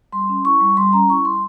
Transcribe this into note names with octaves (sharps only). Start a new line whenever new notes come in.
G3 C6
C#4
E4 C#6
G3
G3 C6
C#4 A#5
E4 C#6
G3 C6